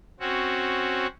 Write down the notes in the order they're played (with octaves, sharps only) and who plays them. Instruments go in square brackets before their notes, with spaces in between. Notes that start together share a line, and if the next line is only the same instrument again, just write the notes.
[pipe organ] C4 C#4 F#4